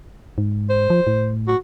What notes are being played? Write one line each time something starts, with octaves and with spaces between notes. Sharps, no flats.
G#2
C5
F3
A2
F#4